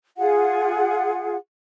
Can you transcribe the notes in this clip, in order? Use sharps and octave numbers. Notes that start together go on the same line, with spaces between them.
F4 G#4 F#5